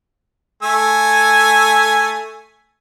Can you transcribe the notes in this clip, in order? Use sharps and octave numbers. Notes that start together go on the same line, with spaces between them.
A3 G#5 E6